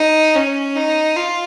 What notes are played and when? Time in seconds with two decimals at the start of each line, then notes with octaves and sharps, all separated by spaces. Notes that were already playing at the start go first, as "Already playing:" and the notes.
Already playing: D#4
0.34 C#4
0.76 D#4
1.16 F4